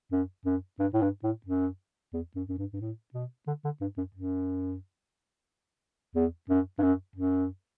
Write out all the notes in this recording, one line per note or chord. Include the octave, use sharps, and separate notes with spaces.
F#2
F#2
G2
A2
G2
A2
F#2
E2
F#2
F#2
G2
G2
A2
B2
D3
D3
G2
F#2
F#2
E2
F#2
G2
F#2
F#2